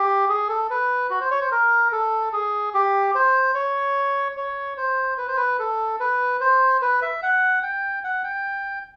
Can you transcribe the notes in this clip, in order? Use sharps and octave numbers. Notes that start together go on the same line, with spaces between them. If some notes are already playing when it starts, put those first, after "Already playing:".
Already playing: G4
G#4
A4
B4
F#4
C5
C#5
C5
A#4
A4
G#4
G4
C5
C#5
C#5
C5
B4
C5
B4
A4
B4
C5
B4
E5
F#5
G5
F#5
G5